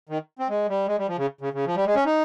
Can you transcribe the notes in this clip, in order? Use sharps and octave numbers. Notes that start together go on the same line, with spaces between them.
D#3
C4
G#3
G3
G#3
G3
F3
C#3
C#3
C#3
F3
G3
G#3
C#4
D#4